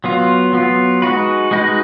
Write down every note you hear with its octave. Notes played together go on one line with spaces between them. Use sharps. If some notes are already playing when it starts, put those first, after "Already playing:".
F#3 B3 F4
F#3 B3 F4
G#3 D#4 F#4 B4
G#3 D#4 F#4 B4